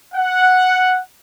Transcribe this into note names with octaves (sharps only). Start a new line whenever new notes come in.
F#5